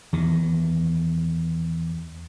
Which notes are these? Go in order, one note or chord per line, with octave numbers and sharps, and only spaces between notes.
E2 D#3